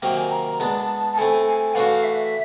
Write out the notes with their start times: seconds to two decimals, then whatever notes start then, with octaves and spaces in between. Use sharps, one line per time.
0.02 C3 D#3 F#3 A#3 G5
0.17 G#5
0.31 A#5
0.60 G#3 B3 D4 A5
1.13 A5
1.18 A3 C4 E4 A4 G#5
1.46 G#5
1.75 E3 A3 D4 F#4 F5
2.04 E5